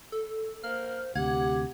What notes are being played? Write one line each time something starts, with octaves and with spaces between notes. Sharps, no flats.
A4
A#3 C5 F6
D2 C3 G4 F#5 G#6